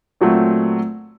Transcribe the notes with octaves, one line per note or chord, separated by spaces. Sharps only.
A#2 F#3 A3 C4